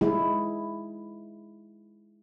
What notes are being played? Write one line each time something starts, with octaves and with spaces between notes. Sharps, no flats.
G#3 E4